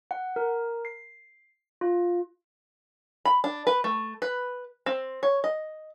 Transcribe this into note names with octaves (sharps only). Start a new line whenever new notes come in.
F#5
A#4
C7
F4
B5
D4
B4
A3
B4
C4
C#5
D#5